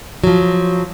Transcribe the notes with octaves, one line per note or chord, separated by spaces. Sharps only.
F3 F#3